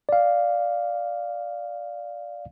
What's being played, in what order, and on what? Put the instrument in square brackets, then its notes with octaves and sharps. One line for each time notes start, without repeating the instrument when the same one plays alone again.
[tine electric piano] D5 F5